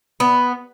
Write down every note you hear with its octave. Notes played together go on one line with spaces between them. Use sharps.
B3